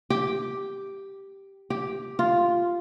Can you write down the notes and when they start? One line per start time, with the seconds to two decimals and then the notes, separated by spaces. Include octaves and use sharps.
0.10 G4
1.70 G4
2.19 F4